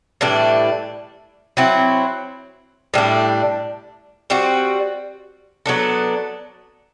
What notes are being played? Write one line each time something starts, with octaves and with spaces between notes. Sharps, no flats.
A2 E3 G3 D4
F#3 C4 E4
A2 G3 D4
G3 C4 F#4
F#3 B3 D4 A4